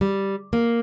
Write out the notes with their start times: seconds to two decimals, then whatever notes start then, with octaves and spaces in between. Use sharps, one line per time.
0.01 G3
0.53 A#3